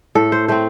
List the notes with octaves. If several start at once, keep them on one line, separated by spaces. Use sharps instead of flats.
A2 A4
C5
A3 C4 C5